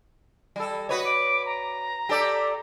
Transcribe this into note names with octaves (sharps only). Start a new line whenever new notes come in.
G3 A4
F#4 B4 C#5 D#5
D6
A#5
G4 A4 D5